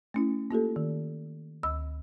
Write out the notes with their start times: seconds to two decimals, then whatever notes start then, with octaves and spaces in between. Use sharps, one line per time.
0.14 A3 C#4 E4
0.51 A#3 F4 G4 A4
0.76 D#3
1.63 D2 B5 E6